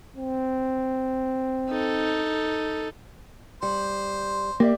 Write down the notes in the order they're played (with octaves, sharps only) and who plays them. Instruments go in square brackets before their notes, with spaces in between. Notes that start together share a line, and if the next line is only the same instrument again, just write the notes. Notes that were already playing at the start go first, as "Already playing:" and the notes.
[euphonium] C4
[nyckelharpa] D#4 A4
[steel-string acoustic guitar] G3 [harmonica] C5
[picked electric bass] A#3 [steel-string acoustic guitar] G4 D5 E5